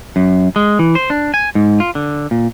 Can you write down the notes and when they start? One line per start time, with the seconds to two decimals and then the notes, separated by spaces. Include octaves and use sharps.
0.16 F#2
0.56 G#3
0.79 E3
0.95 C5
1.10 D4
1.34 G#5
1.55 G#2
1.80 F4
1.95 D3
2.31 A#2